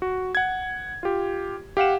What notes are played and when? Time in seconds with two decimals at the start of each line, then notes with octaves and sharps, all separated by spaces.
0.02 F#4
0.35 F#5 G#6
1.03 F4 G4
1.77 G4 F5 F#5 E7